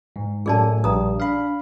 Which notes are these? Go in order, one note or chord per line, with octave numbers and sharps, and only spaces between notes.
G#2
F#2 A2 G#4 A4 D5 G#5 A5
A#1 G2 A#5 D#6
D4 F5 B5